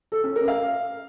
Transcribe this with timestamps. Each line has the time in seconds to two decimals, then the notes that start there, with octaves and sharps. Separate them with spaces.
0.12 A4
0.24 C#4
0.36 A#4
0.48 F5